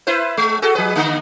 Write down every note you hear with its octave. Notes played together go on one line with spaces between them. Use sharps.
E4 B4 C5
G#3
F#4 G#4 A4
F3 G#4 B4
D3 G#3 A#3